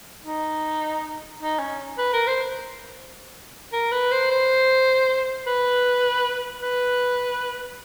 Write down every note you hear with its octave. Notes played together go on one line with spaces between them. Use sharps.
D#4
D#4
C#4
B4
A#4
C5
A#4
B4
C5
C5
B4
B4